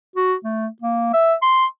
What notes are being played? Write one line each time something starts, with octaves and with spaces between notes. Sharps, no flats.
F#4
A3
A#3
E5
C6